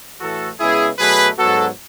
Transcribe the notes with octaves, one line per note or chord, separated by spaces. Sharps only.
A2 E3 A3 F#4 A4
C#3 G#3 B3 E4 G#4
B2 F#3 A3 G#4 B4
G#2 F#3 B3 F#4 A4